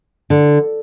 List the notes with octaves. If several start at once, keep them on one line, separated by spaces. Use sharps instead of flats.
D3